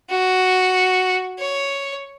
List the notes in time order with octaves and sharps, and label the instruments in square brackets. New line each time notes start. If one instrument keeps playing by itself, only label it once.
[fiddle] F#4
C#5